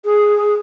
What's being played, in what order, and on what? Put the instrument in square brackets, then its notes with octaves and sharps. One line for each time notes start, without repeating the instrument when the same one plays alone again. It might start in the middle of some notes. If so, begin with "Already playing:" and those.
[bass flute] G#4